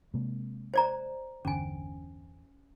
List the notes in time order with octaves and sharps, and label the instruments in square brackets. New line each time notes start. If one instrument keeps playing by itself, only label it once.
[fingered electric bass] C3 G#3 A#3
[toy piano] C5 D5 A#5
[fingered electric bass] G1 E2 D3 [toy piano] C#4 G#5